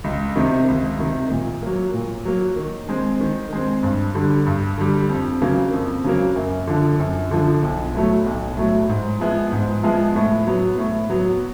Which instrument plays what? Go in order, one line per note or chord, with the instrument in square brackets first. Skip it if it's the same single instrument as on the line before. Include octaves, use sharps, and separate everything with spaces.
[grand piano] C#2
C3 D#3
C#2
C3 D#3
A#2
F#3 A#3
A#2
F#3 A#3
D#3
G#3 C4
D#3
G#3 C4
G2
D3 G3
G2
D3 G3
F2
C#3 F#3 A#3
F2
C#3 F#3 A#3
F#2
D3 F3
F#2
D3 F3
B1
A2 F#3 A3
B1
A2 F#3 A3
G#2
F3 G#3 B3 E4
G#2
F3 G#3 B3 E4
A2
F#3 B3
A2
F#3 B3